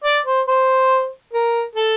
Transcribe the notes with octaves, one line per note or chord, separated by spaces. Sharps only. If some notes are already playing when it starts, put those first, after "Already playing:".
D5
C5
C5
A#4
A4